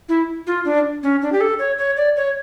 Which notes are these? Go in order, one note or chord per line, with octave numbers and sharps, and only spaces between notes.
E4
F4
D4
C#4
D4
G4
A4
C#5
C#5
D5
C#5